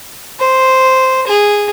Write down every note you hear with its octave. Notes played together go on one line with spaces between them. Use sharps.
C5
G#4